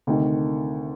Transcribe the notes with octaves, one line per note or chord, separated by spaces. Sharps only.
D2 C3 D#3